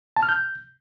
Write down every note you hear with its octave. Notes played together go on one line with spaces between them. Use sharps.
A5
F6
G6